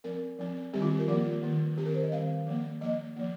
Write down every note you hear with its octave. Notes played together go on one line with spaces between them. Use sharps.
F3 C4 A#4
F3 C4
D#3 G3 C4 G4
F4
G4
A#4
F3 A#3 F4
D#3 A#3
D#3 C4 G4
A#4
C5
D#5
D#3 G3 C4 F5
F3 A#3
F3 A#3 D#5
F3 A#3